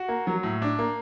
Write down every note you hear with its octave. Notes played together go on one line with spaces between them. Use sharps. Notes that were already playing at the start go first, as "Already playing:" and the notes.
Already playing: F#4
A#3
F#3
A2
D4
A#3